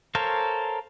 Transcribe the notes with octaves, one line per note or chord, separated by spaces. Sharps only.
A4 A#4 C5 C#5 F5